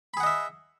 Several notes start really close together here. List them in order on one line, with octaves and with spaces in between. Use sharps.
B5 G#4 F#5 D#5 E5